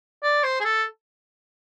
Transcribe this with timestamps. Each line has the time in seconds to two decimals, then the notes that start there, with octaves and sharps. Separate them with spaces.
0.23 D5
0.44 C5
0.60 G#4
0.65 A4